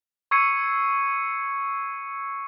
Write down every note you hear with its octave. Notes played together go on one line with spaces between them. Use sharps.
C#6 E6 G#6 C7 C#7 D#7